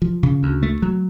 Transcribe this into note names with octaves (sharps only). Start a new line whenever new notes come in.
F3
C#3
D2
A3
F#3